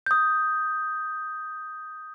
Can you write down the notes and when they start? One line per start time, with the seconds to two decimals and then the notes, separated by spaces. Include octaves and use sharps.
0.06 D#6 G6